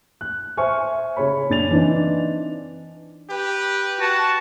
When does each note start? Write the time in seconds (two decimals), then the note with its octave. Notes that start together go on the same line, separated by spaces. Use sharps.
0.21 F#6
0.57 C5 E5 G#5 C#6 F6
1.16 C#3 G#4 C#5 B5
1.49 F#1 D4 A6 F7
1.71 E3 C4 D4 D#4
3.30 G4 B4
4.00 F#4 A5